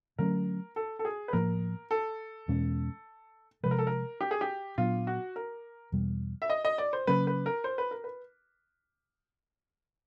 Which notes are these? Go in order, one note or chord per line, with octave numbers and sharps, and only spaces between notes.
D3 F#3 A3 C#4 A#4
A4
A4
G#4
B4
A2 F3 A#3 A#4
A4
E2 B2 G#3 C#4
C3 F3 G#3 B4
A#4
A4
A#4
G4
G#4
G4
A#2 F#3 B3 D4 F4
F#4
A#4
E2 B2 G3
E5
D#5
D#5
D5
C5
C#3 F#3 A#3 C#4 B4
B4
A#4
C5
B4
A#4
B4